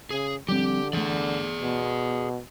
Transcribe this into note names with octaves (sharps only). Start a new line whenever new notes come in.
C#3 G#4
D3 F3 G3 C4 G4
E3 A3 G#4 D5
B2